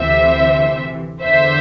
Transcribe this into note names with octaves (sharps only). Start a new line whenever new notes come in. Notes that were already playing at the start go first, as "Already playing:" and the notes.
Already playing: D2 C3 E3 C5 E5
E2 D3 C5 E5